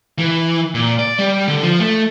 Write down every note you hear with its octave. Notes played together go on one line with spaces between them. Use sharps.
E3
A#2
D5
G3
D3
F3
A3